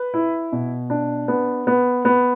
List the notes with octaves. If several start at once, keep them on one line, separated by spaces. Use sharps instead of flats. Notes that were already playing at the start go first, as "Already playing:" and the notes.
Already playing: B4
E4
B2
D4
B3
B3
B3